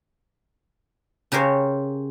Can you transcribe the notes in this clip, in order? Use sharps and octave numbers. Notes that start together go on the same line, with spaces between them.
C#3 G4 A#4 C5 C#5